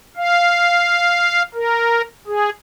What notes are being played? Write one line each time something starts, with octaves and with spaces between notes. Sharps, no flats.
F5
A#4
G#4